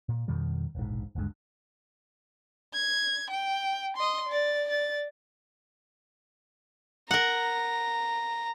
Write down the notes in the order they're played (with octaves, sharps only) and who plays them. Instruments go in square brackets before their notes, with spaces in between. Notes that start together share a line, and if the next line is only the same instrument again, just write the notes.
[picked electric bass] A#2
F2 B2 D#3 G3
E1 A#1 G#2
F#1 D2 G2 G#3
[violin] G#6
G5
D#5 C6
D5 A6
D5 A6
[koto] A#4 F#5 [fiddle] A#5